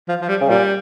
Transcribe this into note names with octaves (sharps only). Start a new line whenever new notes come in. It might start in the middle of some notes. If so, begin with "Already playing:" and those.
F3
F3
G3
C#3
A#2 G3